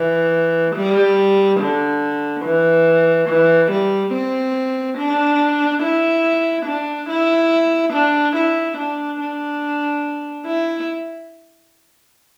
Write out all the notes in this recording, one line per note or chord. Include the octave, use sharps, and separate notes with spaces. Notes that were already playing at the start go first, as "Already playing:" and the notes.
Already playing: E3
G3
D3
E3
E3
G3
C4
D4
E4
D4
E4
D4
E4
D4
D4
E4